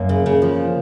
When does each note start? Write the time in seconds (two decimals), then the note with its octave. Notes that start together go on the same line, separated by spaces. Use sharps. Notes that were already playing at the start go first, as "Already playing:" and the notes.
Already playing: F#2 A#3
0.09 C#3
0.26 C#3
0.42 F3